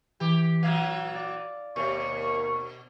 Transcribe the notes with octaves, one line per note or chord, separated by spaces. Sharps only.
E3 G4
A#2 E3 F#3 F5
D5
D#2 B2 C#6